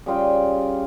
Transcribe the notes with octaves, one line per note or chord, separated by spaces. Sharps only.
C#3 G3 F4 G5